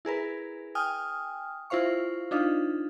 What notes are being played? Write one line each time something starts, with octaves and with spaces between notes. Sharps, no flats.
E4 G#4 A#4 B4
G5 G#5 D#6 F6
E4 F4 C5 F5 C#6
D4 D#4 F4 F5